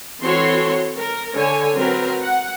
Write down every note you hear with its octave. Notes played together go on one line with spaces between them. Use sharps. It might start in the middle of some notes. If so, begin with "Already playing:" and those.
E3 C4 F#4 A4 C#5 C6
A#4
D3 C#5 G#5
F#3 C4 A#4 B4
F#5